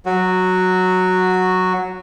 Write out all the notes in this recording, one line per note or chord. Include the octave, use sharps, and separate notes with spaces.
F#3 F#4